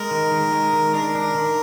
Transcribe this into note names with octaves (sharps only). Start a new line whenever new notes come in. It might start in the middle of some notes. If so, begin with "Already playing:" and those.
Already playing: G#3 A#4
D#3
D#3
G#3
D#3
D4 A#4
D4
D#3